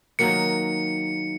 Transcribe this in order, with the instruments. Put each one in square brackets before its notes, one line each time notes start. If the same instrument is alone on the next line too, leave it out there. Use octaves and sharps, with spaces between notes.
[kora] D#3 F#3 A#3 [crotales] C#7